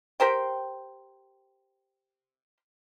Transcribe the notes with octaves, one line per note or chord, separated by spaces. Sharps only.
G4 A#4 C5 G5